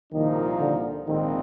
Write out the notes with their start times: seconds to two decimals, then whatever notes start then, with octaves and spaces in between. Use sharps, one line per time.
0.12 C2 A#2 D#3 F3 A#3 D#4
0.60 D3
1.06 A#1 G#2 D#3 F3 C4 D#4